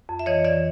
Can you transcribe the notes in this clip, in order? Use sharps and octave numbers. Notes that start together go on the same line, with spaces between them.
F2
E5
E3 C#5 D#5
E3 D5 E5